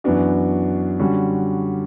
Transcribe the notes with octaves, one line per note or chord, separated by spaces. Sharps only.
F#2 E3 B3 D4 F#4
D3 G3 C#4 F#4